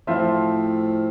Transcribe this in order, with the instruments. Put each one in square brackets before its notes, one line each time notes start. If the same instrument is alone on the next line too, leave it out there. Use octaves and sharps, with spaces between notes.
[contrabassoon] A2 [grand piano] F3 C4 F4 C5 E5